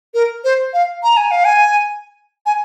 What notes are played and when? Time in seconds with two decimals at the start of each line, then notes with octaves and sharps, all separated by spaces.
0.14 A#4
0.44 C5
0.74 F5
1.03 A#5
1.17 G#5
1.31 F5
1.45 G#5
2.46 G#5